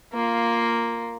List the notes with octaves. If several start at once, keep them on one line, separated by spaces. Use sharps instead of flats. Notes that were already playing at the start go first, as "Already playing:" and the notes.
A#3 F4